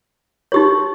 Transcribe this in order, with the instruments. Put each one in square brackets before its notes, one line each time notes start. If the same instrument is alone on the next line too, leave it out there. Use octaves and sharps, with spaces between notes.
[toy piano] D#4 G4 C#5